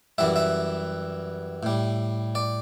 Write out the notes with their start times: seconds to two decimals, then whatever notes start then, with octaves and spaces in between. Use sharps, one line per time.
0.18 F#2 E3 G3 E5
0.36 E5
1.63 A2 G3
2.35 D5